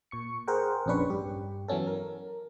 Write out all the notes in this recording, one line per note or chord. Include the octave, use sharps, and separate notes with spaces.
A#2 C#6 C#7
G#4 A#4 C5 F#5 G5
A#1 F2 C#4 D4 B4 C#6
G2 G4
E3 F#3 B3 C#4 A4
A#4